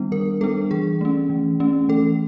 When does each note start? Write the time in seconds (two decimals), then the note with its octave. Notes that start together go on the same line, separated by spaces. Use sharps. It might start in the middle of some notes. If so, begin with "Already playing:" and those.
Already playing: D#3 G3 B3 D4
0.12 D#3 A#4
0.41 G3 B3 D4 A4
0.71 E3 G#4
1.01 A3 C#4
1.30 E3
1.60 A3 C#4
1.89 E3 A4